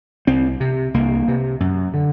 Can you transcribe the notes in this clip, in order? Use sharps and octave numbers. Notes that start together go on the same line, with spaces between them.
C2 C4
C3
C2 A#3
C3
F#2
D3